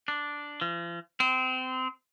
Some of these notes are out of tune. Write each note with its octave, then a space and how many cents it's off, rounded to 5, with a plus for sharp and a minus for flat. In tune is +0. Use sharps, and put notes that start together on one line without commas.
D4 -5
F3 -40
C4 -25